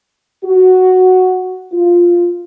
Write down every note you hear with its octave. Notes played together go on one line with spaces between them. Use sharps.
F#4
F4